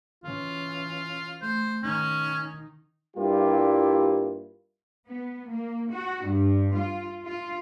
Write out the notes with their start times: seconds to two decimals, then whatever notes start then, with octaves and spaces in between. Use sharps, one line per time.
0.24 E3 C#4 F4
1.42 A3 C5
1.83 D#3 C#4 D#4
3.17 G2 G3 A#3 E4 F4 G4
5.07 B3
5.48 A#3
5.92 F#4
6.26 G2
6.76 F4
7.25 F4